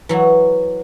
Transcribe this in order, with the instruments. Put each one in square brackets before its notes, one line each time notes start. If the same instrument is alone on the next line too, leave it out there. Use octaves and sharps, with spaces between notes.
[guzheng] E3 F#3